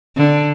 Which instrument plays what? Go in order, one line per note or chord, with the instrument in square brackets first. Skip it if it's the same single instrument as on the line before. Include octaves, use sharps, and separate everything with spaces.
[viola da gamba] D3